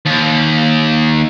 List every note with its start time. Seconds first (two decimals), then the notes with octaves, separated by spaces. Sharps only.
0.06 D#2